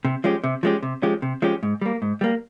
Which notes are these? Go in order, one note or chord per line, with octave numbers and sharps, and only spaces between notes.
C3
F3 G#3 C#4 G4
C3
F3 G#3 C#4 G4
C3
F3 G#3 C#4 G4
C3
F3 G#3 C#4 G4
G#2
G3 A#3
G#2
G3 A#3